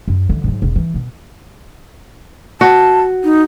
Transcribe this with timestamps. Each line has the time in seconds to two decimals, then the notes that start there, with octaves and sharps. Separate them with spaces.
0.08 F#2
0.29 D3 E3
0.44 G#2 F#3
0.62 E1
0.76 E3
0.94 B2
2.61 F#4 A5
3.24 D#4